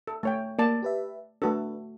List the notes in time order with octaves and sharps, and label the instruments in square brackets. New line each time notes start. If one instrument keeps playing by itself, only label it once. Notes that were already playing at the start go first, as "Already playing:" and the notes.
[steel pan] A4
A3 C#5 G5
[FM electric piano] A#3 [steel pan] D5 A5
[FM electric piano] G4 B4 E5
[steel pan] A3 F#4 A4 [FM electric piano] D4 B4